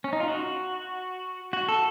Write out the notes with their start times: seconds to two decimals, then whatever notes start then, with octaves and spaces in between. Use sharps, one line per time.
0.04 C#4
0.13 D#4
0.20 F4
0.28 F#4
1.53 F#4
1.68 A4